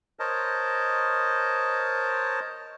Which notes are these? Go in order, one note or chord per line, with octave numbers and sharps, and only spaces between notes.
A#4 C5 C#5 D#5 A5